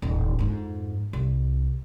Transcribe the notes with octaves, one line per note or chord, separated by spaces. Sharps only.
D#1 A1
F2 G#2
C2